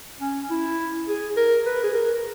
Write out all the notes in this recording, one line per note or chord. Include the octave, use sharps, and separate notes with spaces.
C#4
E4
G#4
A#4
B4
G#4
A#4